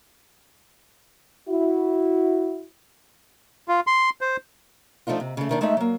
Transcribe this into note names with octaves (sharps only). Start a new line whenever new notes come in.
E4 F#4
F4
C6
C5
F3 A3 D4 D#4 F4
C3
C#3 A3
D#2 D#3 D4
G#3 A3 D#4 D#5 E5
F#3 A#3